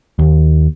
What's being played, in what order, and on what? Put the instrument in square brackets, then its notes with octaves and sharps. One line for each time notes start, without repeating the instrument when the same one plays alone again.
[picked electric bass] D#2